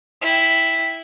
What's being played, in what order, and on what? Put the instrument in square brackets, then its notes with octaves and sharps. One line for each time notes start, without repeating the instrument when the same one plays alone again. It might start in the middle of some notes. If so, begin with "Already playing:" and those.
[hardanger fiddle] E4 G5